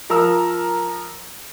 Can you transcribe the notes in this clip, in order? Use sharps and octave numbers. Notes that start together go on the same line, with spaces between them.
F3 A#4 A#5 E6